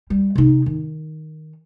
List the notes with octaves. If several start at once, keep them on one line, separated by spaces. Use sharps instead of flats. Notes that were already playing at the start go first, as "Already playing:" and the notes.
G3
C3 D#4
D#3